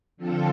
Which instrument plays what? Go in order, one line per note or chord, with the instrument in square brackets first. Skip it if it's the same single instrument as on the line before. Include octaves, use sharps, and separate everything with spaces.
[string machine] D3 F3 C4 F4 A4